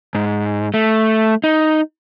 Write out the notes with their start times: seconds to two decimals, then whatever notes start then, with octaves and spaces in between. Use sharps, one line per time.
0.15 G#2
0.74 A3
1.44 D#4